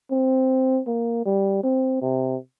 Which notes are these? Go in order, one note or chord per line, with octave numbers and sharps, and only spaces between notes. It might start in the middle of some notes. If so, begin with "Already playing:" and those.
C4
A#3
G3
C4
C3